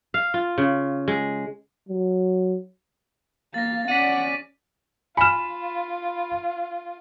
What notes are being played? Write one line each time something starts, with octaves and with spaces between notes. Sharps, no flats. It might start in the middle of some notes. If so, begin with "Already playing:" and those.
F5
F4
C#3
G#3
F#3
A#3 F5 A6 A#6
C#4 D5 F#5 B6 D#7
F4 G#5 B5 F6 E7